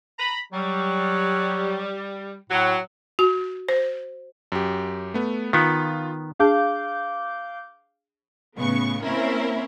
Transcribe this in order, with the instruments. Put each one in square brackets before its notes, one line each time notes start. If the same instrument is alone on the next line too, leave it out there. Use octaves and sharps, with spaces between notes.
[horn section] A#5 B5
[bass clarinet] F#3 [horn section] G3
[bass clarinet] A2 [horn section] F#3
[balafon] F#4
C5
[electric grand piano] F#2 G4
A3 B3
[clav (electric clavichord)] D#3 B3 [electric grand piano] F4
[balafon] D4 G#4 A5 [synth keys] F5 D6 G6
[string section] A2 C#3 B3 C#6
A#3 C4 C#4 E4 A#4